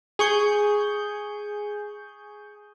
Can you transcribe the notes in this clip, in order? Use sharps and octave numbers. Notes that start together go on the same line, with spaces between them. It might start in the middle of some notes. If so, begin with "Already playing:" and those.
G#4 C#6 G6